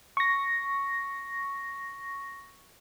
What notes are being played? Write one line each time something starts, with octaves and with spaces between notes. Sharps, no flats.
C#6 A#6